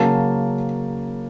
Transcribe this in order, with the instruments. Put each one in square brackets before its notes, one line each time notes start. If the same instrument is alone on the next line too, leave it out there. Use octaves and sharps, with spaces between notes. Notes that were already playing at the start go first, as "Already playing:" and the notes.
Already playing: [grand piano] C#3 F#3 A#3 C#4 A5